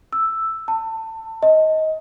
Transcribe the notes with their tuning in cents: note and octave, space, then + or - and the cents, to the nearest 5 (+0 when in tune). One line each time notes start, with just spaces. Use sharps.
E6 +0
A5 +25
D#5 +20